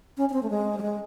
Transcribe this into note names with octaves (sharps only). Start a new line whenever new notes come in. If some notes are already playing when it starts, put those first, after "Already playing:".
C#4
C#4
C4
A3
G#3
G3
G#3